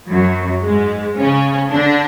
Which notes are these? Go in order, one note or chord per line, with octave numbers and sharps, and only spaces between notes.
F#2 F#3
G#2 G#3
C#3 C#4
D3 D4